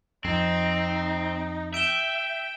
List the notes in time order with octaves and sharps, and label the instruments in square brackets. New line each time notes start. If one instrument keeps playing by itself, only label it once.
[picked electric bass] F2 [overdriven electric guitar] C4 [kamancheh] D#4
[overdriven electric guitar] E5 [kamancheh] G5 [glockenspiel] D7 E7 G7